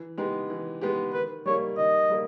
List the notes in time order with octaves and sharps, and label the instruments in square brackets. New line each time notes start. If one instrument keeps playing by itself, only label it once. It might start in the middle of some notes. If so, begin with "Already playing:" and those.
Already playing: [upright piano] E3
G#3 B3 D#4 G4
E3
G#3 B3 D#4 G4
[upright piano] D#3 [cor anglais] B4
[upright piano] G3 A#3 D#4 [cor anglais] C#5
[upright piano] D#3 [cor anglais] D#5
[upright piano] G3 A#3